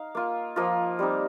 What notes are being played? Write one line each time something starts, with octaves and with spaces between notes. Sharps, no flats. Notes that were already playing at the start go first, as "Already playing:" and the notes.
Already playing: D#4 F5
A#3 F4
F3 A#3 F4 D#5
G3 C4 D#4